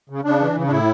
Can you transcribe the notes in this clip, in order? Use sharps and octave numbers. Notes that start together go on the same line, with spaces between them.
C#3
C#3 D4
E3
C#3
D4
A2 E4